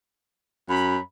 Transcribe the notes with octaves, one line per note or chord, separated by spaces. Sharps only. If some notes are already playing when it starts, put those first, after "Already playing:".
F#2 B5